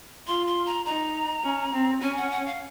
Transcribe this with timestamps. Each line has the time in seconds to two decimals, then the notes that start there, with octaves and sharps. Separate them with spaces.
0.27 F4 C6
0.47 C6
0.66 A#5
0.85 D#4 A#5
1.44 C#4
1.73 C4
2.02 C#4 G#5
2.17 F#5
2.31 F#5
2.46 F5